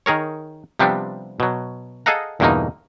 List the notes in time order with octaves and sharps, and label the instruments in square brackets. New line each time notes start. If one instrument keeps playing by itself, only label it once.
[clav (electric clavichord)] D#3 G#4 A#4 C#5
C3 F3 G3 B3 C4 D4
B2 F#3
G#4 A4 D#5 F5 F#5 A#5
E2 G2 B2 D3 A#3 D#4